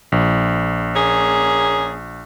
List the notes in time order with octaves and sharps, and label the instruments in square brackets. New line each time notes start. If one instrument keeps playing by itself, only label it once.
[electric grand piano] A#1
[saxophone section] A#3 C#4 G#4